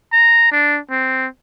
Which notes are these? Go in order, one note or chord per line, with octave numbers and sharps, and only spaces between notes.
A#5
D4
C4